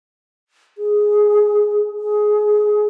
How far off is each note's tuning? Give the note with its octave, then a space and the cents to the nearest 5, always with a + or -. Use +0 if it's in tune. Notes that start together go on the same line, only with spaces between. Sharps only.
G#4 +5
G#4 +15